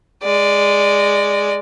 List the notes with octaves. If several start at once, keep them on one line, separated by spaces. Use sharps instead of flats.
G#3 D5